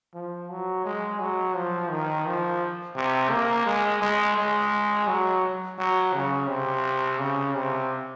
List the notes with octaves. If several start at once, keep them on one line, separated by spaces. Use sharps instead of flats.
F3
F#3
G#3
F#3
F3
D#3
F3
C3
A#3
G#3
G#3
G#3
F#3
F#3
C#3
C3
C#3
C3